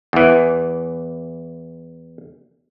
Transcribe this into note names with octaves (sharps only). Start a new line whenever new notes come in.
E2 E3